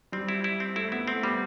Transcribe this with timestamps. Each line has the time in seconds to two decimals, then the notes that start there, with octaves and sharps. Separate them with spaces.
0.12 G3 C4
0.29 E4
0.44 E4
0.60 C4
0.76 A3 E4
0.91 B3 E4
1.08 A3 C4
1.23 G3 B3